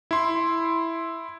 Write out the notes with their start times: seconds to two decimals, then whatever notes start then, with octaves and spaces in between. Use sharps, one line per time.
0.11 E4 C6